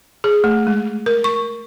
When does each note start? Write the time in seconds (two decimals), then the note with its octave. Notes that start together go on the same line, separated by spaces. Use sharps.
0.24 G#4
0.44 A3
0.67 G#3
1.06 A#4
1.24 C#6